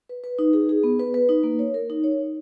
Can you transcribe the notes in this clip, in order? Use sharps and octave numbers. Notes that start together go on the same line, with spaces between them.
B4
B4
D#4
G#4
G#4
B3
B4
B4
D#4
A#3
C#5
A#4
D#4
C#5
D#4